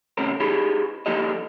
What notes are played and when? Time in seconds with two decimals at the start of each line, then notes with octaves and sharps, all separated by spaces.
0.17 D#2 C3 A3 C#4 A#4
0.40 D#4 G4 G#4 B5
1.06 F3 A#3 D#4 G4 A4 D#5